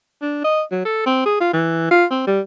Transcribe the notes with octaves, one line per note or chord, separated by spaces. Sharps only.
D4
D#5
F#3
A4
C4
G#4
F4
E3
F4
C4
G3